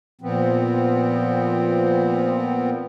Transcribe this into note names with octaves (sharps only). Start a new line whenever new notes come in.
A#2 F3 B3 C4